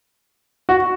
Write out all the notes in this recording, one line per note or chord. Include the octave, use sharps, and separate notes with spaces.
F#4